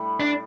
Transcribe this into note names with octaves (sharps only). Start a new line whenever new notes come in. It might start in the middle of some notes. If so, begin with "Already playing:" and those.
Already playing: A2 G3 E4
D4